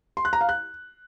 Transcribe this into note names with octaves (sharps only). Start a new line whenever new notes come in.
C6
F#6
A#5
F5
F#6